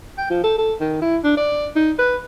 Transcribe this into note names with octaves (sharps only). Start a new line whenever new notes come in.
G5
F3
A4
A4
D#3
E4
D4
D5
D#4
B4